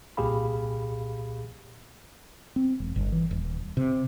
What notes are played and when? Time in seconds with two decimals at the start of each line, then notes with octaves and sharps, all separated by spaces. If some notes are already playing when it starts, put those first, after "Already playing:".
0.17 C2 A#2 G4 G#4 F5 B5
2.56 C4
2.80 E1
2.96 G1
3.12 E3
3.31 D#1
3.77 C3